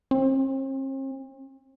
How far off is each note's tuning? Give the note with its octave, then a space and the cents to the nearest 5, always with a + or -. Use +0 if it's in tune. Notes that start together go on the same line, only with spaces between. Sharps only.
C4 +45